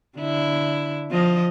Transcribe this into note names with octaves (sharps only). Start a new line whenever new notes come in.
D3 E4
F3 D#5